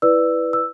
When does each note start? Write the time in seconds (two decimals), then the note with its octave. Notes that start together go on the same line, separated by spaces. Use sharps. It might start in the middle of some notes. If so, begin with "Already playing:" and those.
0.02 E4 B4 D5 E6
0.53 E6